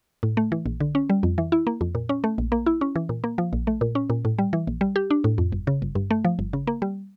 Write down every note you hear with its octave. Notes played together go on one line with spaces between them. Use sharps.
A2
A3
E3
A#1
D3
C#4
G3
F2
E3
E4
A#3
F2
A#2
C#4
A3
A#1
A#3
E4
C#4
E3
A#2
A#3
F3
A#1
A3
A#2
C#4
A#2
A2
G3
E3
A#1
G3
G4
D4
A2
F2
G1
C#3
G1
G2
A3
F3
G1
C#3
A#3
G3